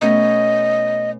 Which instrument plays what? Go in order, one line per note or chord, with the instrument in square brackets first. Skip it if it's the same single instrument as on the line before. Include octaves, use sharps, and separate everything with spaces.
[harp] B2 A3 C#4 [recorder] D#5